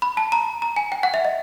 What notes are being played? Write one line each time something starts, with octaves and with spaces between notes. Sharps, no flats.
B5
A5
A#5
A#5
G#5
G5
F#5
E5
D#5